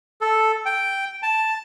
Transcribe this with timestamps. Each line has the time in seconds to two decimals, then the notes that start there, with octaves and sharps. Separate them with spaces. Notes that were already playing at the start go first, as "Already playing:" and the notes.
0.21 A4
0.65 G5
1.23 A5